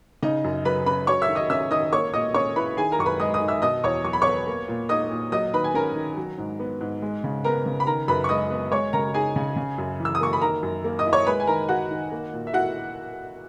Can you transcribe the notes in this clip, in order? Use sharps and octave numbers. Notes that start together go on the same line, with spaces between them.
C#3 D#4 D#5
F#2
F#3 B4 B5
C#4 B4 B5
F#3 C#5 C#6
E5 E6
D#3
D#5 D#6
C#4 E5 E6
D#3 D#5 D#6
A#3 C#5 C#6
A#2 D#5 D#6
C#4 C#5 C#6
E4 B4 B5
D#3 G#4 G#5
A#4 A#5
F#2 C#6
B4 B5
G#3 D#5 D#6
D#5 D#6
D#4
E5 E6
B2 D#5 D#6
E2 C#5 C#6
F#3 C#6
B5
B3 C#5 C#6
A#3
A#2
D#4 D#5 D#6
A#2
F#3 D#5 D#6
D#3 B4 B5
G#5
C#4 A#4 A#5
D#3
F#3
G#2
B3
G#2
G#3
C#3
B3 A#4 A#5
C#3
B5
D#3 A#4 A#5
F#2 B4 B5
C#6
G#3 D#5 D#6
B3
G#3 C#5 C#6
C#3 A#4 A#5
D#4 G#4 G#5
C#3
C#3
F#2
E3
E6
D#6
A#3 C#6
B5
D#3 A#4 A#5
F#2
A#3
D#5 D#6
E4
C#5 C#6
G#3 B4 B5
G#5
D#3 A#4 A#5
D#4 F#4 F#5
D#3
A#3
A#2
E5
E4 F#4 F#5